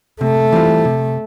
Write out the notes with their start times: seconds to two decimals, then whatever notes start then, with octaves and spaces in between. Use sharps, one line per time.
0.21 C3 A3
0.52 E3 G3 C4 F4
0.85 C3